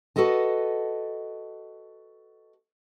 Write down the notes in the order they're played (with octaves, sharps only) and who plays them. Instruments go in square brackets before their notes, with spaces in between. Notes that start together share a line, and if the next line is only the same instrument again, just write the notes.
[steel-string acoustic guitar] F#4 A4 B4 D#5 A5